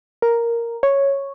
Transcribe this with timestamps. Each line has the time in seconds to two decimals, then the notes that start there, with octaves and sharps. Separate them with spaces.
0.22 A#4
0.83 C#5